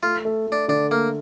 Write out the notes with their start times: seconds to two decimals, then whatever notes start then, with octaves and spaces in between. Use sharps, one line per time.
0.03 A3 F4
0.25 A3
0.47 A3
0.52 D4
0.68 D3 D4
0.91 A3 A#3